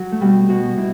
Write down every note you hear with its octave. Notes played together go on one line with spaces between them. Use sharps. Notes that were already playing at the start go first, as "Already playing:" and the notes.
Already playing: F#3
A3
B2 G3
B2 F#4
B2 E4